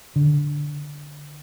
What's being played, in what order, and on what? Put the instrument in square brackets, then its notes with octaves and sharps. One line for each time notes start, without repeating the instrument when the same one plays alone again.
[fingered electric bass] D3